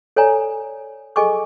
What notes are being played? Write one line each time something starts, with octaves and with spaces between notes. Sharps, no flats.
A4 C#5 D5 G#5 A#5
G#4 A4 D#5 G#5 C#6 D6